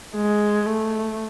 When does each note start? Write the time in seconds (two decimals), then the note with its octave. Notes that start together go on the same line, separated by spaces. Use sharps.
0.15 G#3
0.66 A3